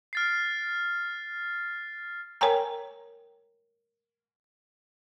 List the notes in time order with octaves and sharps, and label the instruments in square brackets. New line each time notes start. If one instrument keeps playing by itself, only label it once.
[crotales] F6 A6 C7
[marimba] A#4 C#5 G5 G#5 A#5